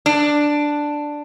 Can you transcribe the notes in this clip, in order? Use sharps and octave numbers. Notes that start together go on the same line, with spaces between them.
D4